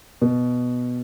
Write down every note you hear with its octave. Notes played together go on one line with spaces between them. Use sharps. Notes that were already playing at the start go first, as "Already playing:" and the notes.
B2